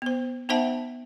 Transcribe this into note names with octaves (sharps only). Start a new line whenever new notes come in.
B3 C5
B3 D#4 C5 E5 F#5 A5